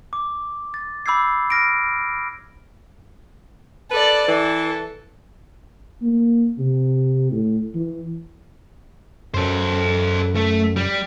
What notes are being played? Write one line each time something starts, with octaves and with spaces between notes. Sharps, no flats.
D6
A6
B5 D6 E6 G6 G#6 C7
F6 A#6 D7
A4 B4 D5
E3 A4
A#3
C3
A2
E3
F#2 A4 C5
A3
G3